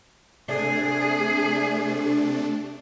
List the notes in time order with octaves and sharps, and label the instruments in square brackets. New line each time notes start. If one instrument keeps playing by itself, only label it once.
[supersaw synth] C3 A3 D4 [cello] G#4